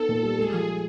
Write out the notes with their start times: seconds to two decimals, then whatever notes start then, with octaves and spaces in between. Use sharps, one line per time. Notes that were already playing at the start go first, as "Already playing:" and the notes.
Already playing: B3 D#4 A4
0.09 A#2
0.23 G3
0.38 G#3 G#4
0.53 F3